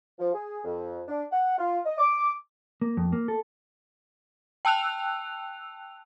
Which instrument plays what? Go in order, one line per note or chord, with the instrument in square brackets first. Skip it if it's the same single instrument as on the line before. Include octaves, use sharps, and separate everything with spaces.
[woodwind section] F3
G#4
F2
D4
F#5
F4
D#5
D6
[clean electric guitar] A#3
F2
A#3
A4
[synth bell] G5 A5 E6 F#6 F7